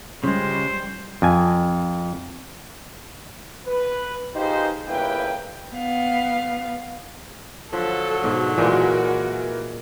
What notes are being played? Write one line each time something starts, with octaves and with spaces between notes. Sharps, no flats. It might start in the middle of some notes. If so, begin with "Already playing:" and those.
C#2 C#3 G3 G#3 C5
F2 G#5
B4
D#4 F4 G4 G#4 B4 C5
G1 C#3 A#3 E4 B4 G5
B3 F5
D3 F3 F#3 A4
G#2 B2
A#2 E3 G#3 F#4 A#4